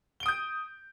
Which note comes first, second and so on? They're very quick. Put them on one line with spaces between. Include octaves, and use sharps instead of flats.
G7 D7 D#6 G6